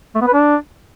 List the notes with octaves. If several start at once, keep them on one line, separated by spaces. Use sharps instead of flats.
A3
B3
B4
D4